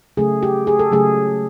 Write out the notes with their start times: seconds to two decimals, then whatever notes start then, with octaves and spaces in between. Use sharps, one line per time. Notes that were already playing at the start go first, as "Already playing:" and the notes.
0.17 C#3 F#3 A3 G#4
0.43 G4
0.67 G#4
0.79 A4
0.92 C#3 F#3 A3 G#4